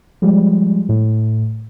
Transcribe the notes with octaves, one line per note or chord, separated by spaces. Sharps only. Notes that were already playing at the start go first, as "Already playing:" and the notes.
F3 G3 G#3
A2